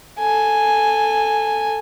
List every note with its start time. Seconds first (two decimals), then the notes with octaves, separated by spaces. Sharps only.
0.19 A4 G#5